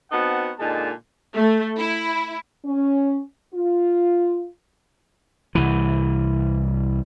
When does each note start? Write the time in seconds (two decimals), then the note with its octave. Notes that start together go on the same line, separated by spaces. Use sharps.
0.11 B3 C4 D#4 F#4 F#5 A5
0.59 A#2 D3 G#3 D#4 A5
1.34 A3
1.79 E4
2.65 C#4
3.54 F4
5.55 C2 E3